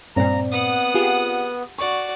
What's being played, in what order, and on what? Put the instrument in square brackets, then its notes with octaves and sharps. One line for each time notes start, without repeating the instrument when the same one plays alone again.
[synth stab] G2 A#2 [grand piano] C4 D5 [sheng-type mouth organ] A#5
[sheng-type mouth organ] B3 [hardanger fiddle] F#5 D#6
[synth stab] F4 G4 G#4
[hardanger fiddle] F#4 D5 [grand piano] C#6